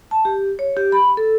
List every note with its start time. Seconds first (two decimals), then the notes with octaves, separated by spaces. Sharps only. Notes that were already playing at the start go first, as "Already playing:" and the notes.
0.11 A5
0.25 G4
0.59 C#5
0.77 G4
0.92 B5
1.17 A4